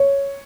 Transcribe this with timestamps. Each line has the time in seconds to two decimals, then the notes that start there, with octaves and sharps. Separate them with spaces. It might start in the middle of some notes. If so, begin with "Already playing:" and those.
Already playing: C#5